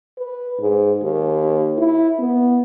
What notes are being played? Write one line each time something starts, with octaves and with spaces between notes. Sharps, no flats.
B4
G#2
D#2
E4
B3